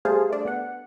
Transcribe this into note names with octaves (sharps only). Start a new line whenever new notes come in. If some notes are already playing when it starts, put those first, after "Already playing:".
G3 A3 G#4 C5 F5 A5
A3 D4
B3 F#5